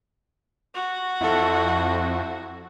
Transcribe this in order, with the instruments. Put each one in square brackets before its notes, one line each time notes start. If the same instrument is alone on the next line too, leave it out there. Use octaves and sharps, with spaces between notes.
[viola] F#4
[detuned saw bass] F2 [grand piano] E4 A4